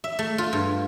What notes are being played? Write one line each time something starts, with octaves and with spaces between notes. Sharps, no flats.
E5
A3
F4
G2